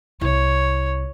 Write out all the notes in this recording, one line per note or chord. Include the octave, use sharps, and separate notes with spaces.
C2 E4 C#5